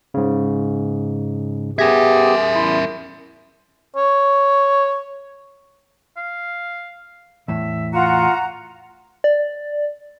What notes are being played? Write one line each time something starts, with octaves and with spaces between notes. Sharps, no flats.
G#2 C#3
B3 G4 G#4 A#4 E5 G#6 A#6
E2 E4 C6
C#5
F5
E2 A2 E5
F4 F#4 F#5 A#5
D5